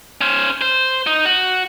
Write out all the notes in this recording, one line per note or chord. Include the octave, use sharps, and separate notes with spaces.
C#4 C5
C5
D#4
F#4